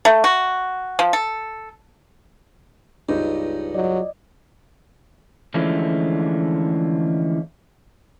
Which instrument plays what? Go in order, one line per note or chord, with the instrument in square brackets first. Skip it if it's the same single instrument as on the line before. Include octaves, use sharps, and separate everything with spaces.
[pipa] A3
F#4
F3
A4
[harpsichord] C#2 G2 [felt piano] D#4
[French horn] F#3 [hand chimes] D5 D#5
[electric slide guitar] D3 E3 F3 G#3 A3 C#4